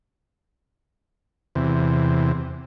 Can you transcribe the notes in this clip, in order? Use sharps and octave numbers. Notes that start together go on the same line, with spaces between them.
E2 C3